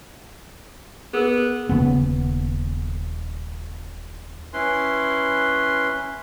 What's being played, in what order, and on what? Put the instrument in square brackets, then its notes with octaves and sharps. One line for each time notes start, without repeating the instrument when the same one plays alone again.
[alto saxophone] B3 [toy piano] G#4 A#4
[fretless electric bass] D#1 C#3 B3
[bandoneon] C#4 E4 B4 C6